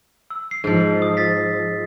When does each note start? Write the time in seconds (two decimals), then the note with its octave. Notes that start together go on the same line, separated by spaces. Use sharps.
0.30 E6
0.51 C7
0.64 G#2 F3
1.02 D#6
1.17 A6 B6